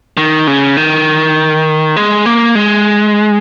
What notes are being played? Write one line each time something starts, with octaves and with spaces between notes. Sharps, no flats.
D#3
C#3
D#3
G#3
A#3
G#3